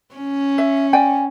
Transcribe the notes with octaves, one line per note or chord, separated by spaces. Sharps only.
C#4
E5
D5 G5 G#5